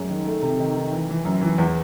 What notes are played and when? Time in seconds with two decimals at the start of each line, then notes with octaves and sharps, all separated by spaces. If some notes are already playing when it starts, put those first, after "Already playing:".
Already playing: F#2 G#3 C#4
0.09 D#3
0.26 A3
0.42 C3
0.59 D#3
0.75 D#3
0.92 E3
1.09 E3
1.25 F#2
1.41 E3
1.58 E2